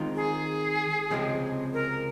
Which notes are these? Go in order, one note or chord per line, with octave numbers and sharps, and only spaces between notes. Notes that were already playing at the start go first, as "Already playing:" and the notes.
Already playing: D#3 G#3 C4 F4 C5
G#4
C#2 C3 F3 G#3 C4
A#4